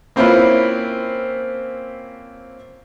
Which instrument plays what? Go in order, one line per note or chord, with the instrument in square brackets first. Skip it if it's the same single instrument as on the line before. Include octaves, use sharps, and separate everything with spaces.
[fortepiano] A#3 C4 C#4 E4 F4 B4